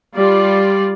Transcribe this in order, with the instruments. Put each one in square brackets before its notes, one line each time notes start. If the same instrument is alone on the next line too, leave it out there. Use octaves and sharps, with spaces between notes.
[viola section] G3 F4 D5